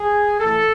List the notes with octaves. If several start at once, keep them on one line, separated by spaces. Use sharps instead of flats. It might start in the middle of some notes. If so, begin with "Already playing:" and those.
Already playing: G#4
A2 E3 A4